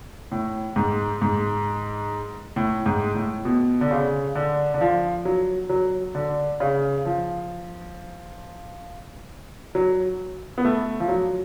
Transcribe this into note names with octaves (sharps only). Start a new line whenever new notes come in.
A2
G#2
G#2
A2
G#2
A2
B2
D3
C#3
D3
D3
F3
F#3
F#3
D3
C#3
F3
F#3
B3
A3
F3
F#3